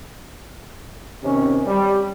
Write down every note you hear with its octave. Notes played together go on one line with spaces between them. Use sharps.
C3 D#3 C#4
G3